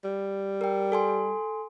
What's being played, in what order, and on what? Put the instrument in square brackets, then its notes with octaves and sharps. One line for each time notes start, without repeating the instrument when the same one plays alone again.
[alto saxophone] G3
[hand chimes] A#4 G5
A4 G#5 C6